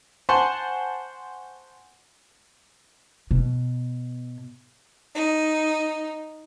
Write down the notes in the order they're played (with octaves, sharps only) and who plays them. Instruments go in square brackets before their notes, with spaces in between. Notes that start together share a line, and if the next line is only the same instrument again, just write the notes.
[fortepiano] C5 F#5 G#5 A5 C6 C#6
[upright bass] B2
[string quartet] D#4